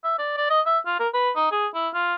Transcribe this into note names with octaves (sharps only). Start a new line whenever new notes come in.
E5
D5
D5
D#5
E5
F4
A#4
B4
D#4
G#4
E4
F4